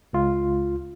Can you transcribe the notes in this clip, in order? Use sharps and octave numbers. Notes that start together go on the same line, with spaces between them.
C#2 F4